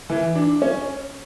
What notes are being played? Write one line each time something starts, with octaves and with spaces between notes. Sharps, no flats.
E3
D4
C#4